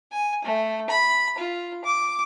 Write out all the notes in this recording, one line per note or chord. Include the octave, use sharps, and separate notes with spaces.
G#5
A3
B5
F4
D6